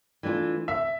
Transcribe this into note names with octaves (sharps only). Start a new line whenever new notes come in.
E3 A3 D4 F4
E5